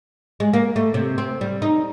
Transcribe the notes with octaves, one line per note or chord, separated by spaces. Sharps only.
G#3
A#3
A3
C3
C4
G3
D#4